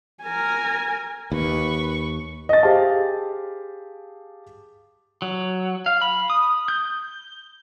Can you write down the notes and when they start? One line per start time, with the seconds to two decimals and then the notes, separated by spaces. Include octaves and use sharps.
0.23 A#4 G#5
1.32 D#2 B4 C#6
2.49 D#5 A6
2.63 G4 G#4 C5 F5 A5
5.22 F#3
5.86 F5
6.02 B5
6.30 D#6
6.68 G6